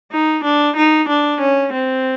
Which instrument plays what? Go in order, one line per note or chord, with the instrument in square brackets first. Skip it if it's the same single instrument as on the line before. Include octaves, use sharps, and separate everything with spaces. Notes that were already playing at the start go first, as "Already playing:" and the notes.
[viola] D#4
D4
D#4
D4
C#4
C4